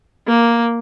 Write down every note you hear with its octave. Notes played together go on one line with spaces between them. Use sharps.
A#3